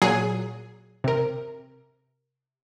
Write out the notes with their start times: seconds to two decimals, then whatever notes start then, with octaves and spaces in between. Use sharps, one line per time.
0.02 A#2 F#3 G#4
1.04 C3 A#4